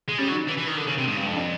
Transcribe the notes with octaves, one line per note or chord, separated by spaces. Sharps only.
G#3
G3 C#4
F#3
D#4
E3 D4
E3
D#3
D3
C#3
C3
G#2
G2
F2
D4